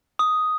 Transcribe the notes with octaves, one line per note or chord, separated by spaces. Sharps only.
D#6